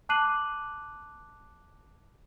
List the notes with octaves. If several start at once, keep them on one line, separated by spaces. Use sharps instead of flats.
A5 D6 F#6 C7 D#7 F#7